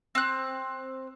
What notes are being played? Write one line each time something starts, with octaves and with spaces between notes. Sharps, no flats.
C4 F#6